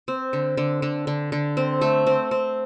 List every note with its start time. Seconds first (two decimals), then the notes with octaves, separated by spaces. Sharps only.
0.08 C4
0.33 D3
0.57 D3
0.82 D3
1.07 D3
1.32 D3
1.57 C4
1.81 A3
2.07 C4
2.31 C4